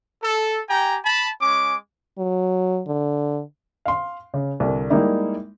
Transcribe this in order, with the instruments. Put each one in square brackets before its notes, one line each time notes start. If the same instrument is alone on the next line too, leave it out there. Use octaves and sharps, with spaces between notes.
[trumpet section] A4
G4 G5 G#5 A#5
A5 B5
G#3 C#4 D6
[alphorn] F#3
D3
[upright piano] F5 C6
C#3
C2 D3 A#4
G3 G#3 A#3 D#4 E4